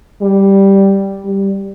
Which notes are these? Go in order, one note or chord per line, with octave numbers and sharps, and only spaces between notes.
G3
G3